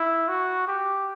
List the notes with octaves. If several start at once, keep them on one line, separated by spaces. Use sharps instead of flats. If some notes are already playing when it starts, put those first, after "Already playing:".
Already playing: E4
F#4
G4